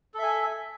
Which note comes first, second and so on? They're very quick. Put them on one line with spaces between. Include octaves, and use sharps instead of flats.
A4 E5 G#5